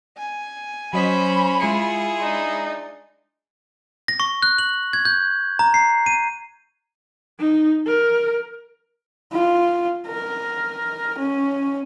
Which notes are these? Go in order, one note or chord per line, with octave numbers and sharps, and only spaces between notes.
G#5
F#3 C#4 C5 D#5 B5 B6
G#3 E4 F4 G#4 C6 C#7
D4 D#4
A#6
C#6
F#6
F#7
G#6
G6
A#5
C7
D#7
D#4
A#4
F4
A#4
C#4